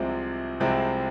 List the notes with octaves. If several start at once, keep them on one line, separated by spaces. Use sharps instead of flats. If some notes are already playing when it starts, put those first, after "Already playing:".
Already playing: C2 C3 F3 G#3 C4
C2 C3 F3 G#3 C4